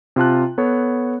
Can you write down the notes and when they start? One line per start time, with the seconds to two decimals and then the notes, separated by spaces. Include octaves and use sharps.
0.16 C3 F4 A5 F#6
0.58 B3 A4 C#5